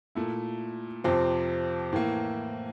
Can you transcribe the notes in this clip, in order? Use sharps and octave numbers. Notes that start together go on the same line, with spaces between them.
A#2 A3 E4
F2 C3 F3 C4
A2 E3 A#3